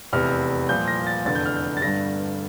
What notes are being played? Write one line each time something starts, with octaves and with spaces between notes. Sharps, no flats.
F1 E2 C3 F6
C2 A#2 F3 G6
A#6
A6
F1 E2 D3 A6
G6
F6
G6
A6
G1 G2 D3 A#6